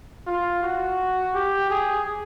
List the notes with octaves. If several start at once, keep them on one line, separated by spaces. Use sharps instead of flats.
F4
F#4
G4
G#4